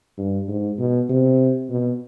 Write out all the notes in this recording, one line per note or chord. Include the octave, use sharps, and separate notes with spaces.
G2
G#2
B2
C3
B2